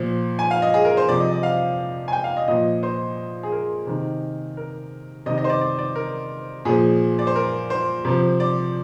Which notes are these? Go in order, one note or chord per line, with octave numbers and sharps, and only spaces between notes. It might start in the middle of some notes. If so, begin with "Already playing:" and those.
Already playing: A#2 F3
G#5
F5
D#5
G#4
A#4
C5
C3 F3 D5
D#5
D#5
F5
G#5
G5
F5
D#5
A#2 F3 D#5
C5
G#4
A#4
C3 D#3
A#4
C3 D#3 D#5
D#5
C5
D5
D5
D5
A#4
A#2 F3 G#4
D5
C5
A#4
C5
C3 F3
D5